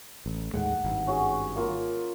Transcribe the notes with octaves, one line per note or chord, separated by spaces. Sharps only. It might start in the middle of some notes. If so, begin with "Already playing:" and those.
A1
D#2 A2 G#3 F#5 G5
G#1 G2
C#4 F#4 G#4
A#3 F4 A#4